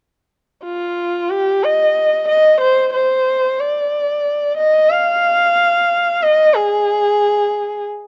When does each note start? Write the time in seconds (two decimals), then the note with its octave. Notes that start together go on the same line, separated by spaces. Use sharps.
0.64 F4
1.30 G4
1.63 D#5
2.28 D#5
2.61 C5
2.94 C5
3.60 D5
4.57 D#5
4.90 F5
6.22 D#5
6.55 G#4